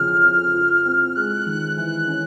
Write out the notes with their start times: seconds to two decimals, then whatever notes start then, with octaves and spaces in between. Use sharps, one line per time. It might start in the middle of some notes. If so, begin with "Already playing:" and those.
Already playing: F2 C#3 F3 F6
0.23 F2
0.54 F4
0.86 C4
1.15 G#3 F#6
1.46 D#3
1.77 E3 F#6
2.08 C#4